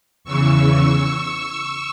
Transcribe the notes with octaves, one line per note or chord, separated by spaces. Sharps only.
E2 C#3 E3 C#6 E6